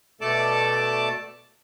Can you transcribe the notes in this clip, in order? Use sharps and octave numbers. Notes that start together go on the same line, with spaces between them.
B2 A3 A4 D5 A5 D6